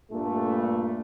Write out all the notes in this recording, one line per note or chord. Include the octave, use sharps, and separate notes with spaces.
G2 A#2 A3